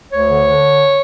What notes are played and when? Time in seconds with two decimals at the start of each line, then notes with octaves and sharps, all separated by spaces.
0.12 D2 C#5
0.28 D3
0.46 D3